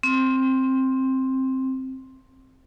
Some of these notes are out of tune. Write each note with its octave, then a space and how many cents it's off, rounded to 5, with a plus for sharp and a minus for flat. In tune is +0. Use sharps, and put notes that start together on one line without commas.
C4 +10